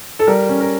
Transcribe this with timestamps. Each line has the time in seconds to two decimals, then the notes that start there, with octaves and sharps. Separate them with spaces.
0.19 A4
0.27 G3 A#4
0.49 C#4
0.60 A#4